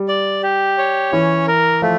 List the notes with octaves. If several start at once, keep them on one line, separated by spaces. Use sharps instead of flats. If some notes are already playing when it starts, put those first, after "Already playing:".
Already playing: G3
D5
G4
C#5
E3 C#4
A#4
F3 A3